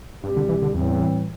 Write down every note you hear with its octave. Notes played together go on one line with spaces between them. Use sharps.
C2 G2 B2 G3 C4 G4
D3
E3
D3
E2 A2 E3 G3 C4